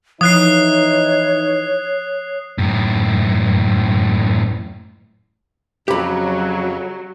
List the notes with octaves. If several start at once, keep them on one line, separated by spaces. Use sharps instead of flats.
E3 F3 D#4 C#5 D#6 F#6 C7
F#2 A2
F2 C#3 F#3 G4 B5